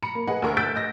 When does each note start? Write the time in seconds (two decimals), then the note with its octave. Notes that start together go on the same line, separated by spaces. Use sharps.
0.02 A#5 B5 C#7
0.15 A#3
0.27 G#4 B4 D#5 F#5
0.42 D2 D3 A#4 C#6
0.57 E6 F#6 G6 A6 B6 D7
0.76 D#5 A#6